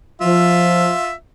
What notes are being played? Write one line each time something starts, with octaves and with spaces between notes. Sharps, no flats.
F3 F4 E5